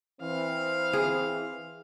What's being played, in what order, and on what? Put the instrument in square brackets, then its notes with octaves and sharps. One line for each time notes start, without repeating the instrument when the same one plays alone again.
[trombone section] E3 C4 [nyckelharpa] F5
[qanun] G#4